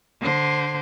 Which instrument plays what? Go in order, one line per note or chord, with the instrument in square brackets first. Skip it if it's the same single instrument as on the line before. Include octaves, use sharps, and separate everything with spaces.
[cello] D3 C5